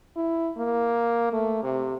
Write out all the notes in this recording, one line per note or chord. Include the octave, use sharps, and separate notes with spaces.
E4
A#3
A3
C3